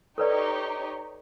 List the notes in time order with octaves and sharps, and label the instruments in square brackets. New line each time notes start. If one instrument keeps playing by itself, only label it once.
[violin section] D#4 G4 C#5 [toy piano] A4 B4 D5